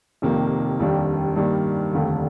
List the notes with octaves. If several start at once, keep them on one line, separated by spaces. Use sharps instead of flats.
F1 F2 C3 D#3 A#3
F1 D#2 D#3 G3 D4
G2 D#3 G3 A#3
F1 D#2 D3 A3